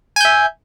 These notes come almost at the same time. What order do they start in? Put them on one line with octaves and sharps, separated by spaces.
G#5 G6 E5